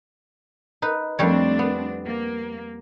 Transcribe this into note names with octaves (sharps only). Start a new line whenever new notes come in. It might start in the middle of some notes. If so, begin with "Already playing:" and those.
D#4 B4
F2 G3 A3 C4 D4 C#5
B3
A#3